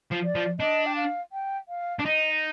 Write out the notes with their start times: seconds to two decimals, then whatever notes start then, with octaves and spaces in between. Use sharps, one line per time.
0.11 F3
0.24 D5
0.35 F3
0.60 D4 D#5
0.86 G5
0.96 F5
1.32 G5
1.68 F5
1.99 D4
2.05 D#4 D#5